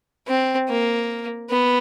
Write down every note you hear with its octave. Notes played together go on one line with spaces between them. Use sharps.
C4
A#3
B3